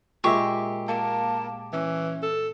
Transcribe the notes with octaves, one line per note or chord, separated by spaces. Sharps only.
A#2 G#3 G4 E5 C#6
A#3 A5
E3 C#4
A4